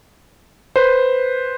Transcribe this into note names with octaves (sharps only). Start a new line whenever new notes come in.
B4 C5